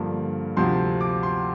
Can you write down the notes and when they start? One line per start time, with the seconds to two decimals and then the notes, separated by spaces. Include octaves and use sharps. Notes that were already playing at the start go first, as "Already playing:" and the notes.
Already playing: G2 D3 F3 A#3
0.57 D2 C3 F3 C4 C6
1.01 D6
1.23 C6